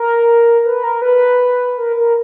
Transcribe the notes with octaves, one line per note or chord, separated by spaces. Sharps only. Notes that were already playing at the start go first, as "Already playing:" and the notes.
Already playing: A#4
B4
A#4
B4
A#4
A#4